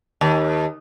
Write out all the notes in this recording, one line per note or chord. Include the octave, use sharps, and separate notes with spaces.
D#2